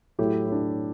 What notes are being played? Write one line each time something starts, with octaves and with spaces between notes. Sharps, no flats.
A2 F#3 A3 E4 G4
E4
D4